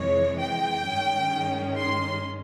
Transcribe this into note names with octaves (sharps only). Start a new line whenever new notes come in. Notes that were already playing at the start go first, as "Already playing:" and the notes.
Already playing: F2 C3 E3 G#3 C#5
G5
G2 D#3 G#3 C#4
C6